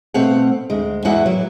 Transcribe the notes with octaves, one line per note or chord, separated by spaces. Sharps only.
B2 A3 C4 F5 F#5
D2 G#3
E2 G#3 E4 F#4 F#5
F#3 A#3